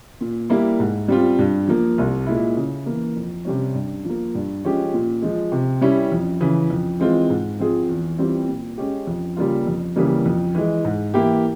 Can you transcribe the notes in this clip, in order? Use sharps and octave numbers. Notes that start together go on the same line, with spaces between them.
A#2
G3 A#3 E4
G#2
G3 C4 F4
G2
F3 A#3
C2
A#2 G#3 E4
C#3
E3 A#3
F2
C3 G3 C#4
G2
F3 A#3
G2
F3 G#3 C#4 G4
A#2
F3 G#3
C3
G3 C#4 E4
F2
C#3 E3
F2
E3 G#3 C4 F4
G#2
F3 C4 F4 G#4
E2
E3 G3 C4 F4
A#2
G#3 C#4 G4
F2
C#3 G3 A#3 F4
F2
C#3 E3 G3 A#3
F2
E3 G#3
G#2
E3 A#3 E4 G4